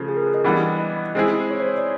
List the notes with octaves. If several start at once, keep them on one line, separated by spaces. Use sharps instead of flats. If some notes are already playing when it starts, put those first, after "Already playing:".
Already playing: C#3 F3 A3
G#4
A#4
B4
D#5
E3 G3 B3 D4
D#5
G#3 C4 E4 G#4
C#5
C5
C#5
D5